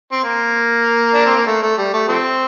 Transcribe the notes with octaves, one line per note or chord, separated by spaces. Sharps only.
C4
A#3
D4
C4
A#3
A3
A3
G3
A3
F3 A3 C4